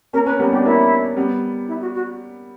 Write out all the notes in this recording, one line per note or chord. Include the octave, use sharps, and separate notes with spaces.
A#3 C#4 A#4
A#3 C#4 B4
G3 B3 A#4
B3 D4 G4
A#3 C#4 E4
G3 B3
E4
F#4
F#4